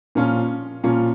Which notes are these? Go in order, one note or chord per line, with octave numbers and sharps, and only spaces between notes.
A#2 F3 C#4 F4
A#2 F3 C#4 F4